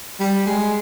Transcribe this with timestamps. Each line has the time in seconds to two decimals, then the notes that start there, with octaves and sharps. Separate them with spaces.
0.20 G3
0.47 G#3